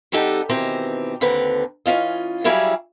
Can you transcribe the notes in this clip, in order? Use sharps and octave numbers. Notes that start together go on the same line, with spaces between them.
C3 G3 D#4 G4 A4 F#5
B2 D#3 E3 C4 G4 A#5
D#2 D3 C4 B4 A#5
E3 C#4 F4 D#5
F#3 G3 E4 G#4 E5 F5